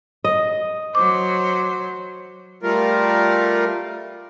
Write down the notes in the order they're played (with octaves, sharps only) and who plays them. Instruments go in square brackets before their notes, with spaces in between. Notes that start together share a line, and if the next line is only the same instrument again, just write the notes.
[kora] D#5
[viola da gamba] F#3 C5 [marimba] D6
[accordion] G3 A3 F4 A#4